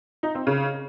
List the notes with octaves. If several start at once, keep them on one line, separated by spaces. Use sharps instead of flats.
D#4
C4
C#3